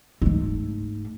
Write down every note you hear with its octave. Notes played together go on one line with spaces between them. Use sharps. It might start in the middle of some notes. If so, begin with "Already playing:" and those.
G#2 A3